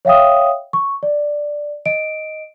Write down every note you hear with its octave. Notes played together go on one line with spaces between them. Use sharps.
C#5 E5 F5 G5 D#6
C#6
D5
D#5 D7